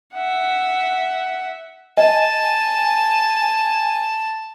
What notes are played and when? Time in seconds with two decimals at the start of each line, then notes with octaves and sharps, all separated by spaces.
0.14 E5 F#5
1.97 D#5 G#5 A5